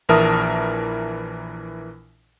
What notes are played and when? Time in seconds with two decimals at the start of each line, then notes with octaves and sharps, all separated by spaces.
0.09 A#1 E3 A#4 E5 A5 D#6